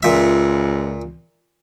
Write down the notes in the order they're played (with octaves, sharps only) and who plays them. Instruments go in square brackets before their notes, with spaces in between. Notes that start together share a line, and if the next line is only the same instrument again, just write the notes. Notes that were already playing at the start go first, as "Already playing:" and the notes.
[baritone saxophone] C#2 [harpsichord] A#2 E5